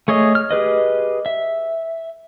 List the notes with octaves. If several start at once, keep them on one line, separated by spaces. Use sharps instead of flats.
A3 G#4 C#5 D#5
F6
G4 G#4 B4 D#5
E5